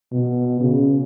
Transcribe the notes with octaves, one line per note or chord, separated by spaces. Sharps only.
B2
C#3